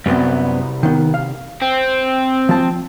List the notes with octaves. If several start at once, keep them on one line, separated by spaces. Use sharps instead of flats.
C2 F#2 B3 C4
D#3 B3
F5
C4
F3 A5